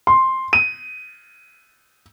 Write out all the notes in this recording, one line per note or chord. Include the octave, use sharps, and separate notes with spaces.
C6
D#7